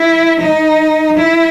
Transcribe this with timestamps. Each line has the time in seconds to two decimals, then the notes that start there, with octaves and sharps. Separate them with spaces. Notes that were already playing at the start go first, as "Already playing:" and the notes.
Already playing: E4
0.40 D#4
1.18 E4